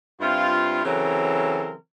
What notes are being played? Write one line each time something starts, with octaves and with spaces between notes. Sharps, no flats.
G2 C4 E4 F4
C#3 E3 F#3 C4 A4 A#4